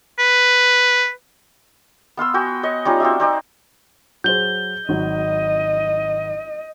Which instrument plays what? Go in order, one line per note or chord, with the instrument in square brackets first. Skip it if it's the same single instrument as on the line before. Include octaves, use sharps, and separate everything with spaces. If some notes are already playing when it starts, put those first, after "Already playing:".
[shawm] B4
[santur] B3 F5 C6 E6
F#4 G5 G#5
C#5 D#5
G3 C#4 D#4 F4
C4 F#4 D5 E5
C4 D#4 D5
[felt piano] F#3 G#4 C5 [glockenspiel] G6 G7
[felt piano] G#1 F#3 [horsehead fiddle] D#5